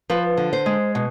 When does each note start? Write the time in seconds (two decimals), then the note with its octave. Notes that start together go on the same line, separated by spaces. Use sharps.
0.10 F3 B4
0.37 D3
0.53 C5
0.66 G#3
0.95 B2